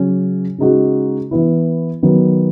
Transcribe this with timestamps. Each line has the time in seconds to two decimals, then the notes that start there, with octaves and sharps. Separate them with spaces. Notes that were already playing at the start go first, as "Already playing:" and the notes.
Already playing: C#3 F#3 C#4
0.58 C#3 G#3 D#4 F#4
1.31 E3 B3 E4
2.03 D#3 F#3 B3